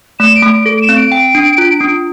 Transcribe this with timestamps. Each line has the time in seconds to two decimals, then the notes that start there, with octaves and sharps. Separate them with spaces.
0.19 A3 E7
0.35 D7
0.43 A3
0.51 D7
0.65 A4 D7
0.77 D7
0.81 E7
0.89 C4
0.96 D7
1.12 G5
1.35 D4
1.58 F4
1.81 D4